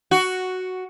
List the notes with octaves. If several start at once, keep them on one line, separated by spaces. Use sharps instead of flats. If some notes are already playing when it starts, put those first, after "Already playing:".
F#4